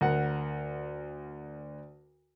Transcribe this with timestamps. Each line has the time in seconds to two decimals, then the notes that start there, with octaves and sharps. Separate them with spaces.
0.01 D2 A#4 F#5